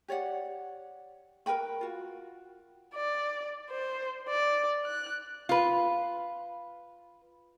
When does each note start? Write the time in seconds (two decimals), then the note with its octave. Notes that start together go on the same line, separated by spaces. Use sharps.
0.08 G4 C#5 D5 F#5
1.46 A#4 B4 G5 B5
1.81 F4 F#4
2.94 D5
3.70 C5
4.29 D5
4.85 F#6
5.49 F4 B4